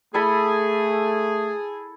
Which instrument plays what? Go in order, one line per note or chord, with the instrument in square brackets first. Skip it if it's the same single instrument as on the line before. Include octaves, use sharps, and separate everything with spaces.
[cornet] A3 [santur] E4 A4 B5 [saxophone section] G#4